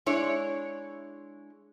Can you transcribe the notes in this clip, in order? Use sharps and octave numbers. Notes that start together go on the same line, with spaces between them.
G#3 D4 E4 C#5